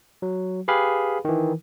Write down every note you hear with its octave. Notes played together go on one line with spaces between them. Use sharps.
F#3
G4 G#4 B4 F5 B5
D#3 E3